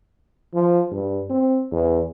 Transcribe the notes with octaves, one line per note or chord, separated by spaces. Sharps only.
F3
G2
C4
E2